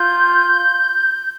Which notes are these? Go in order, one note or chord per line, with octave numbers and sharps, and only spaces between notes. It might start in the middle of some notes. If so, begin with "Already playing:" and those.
Already playing: F4 G6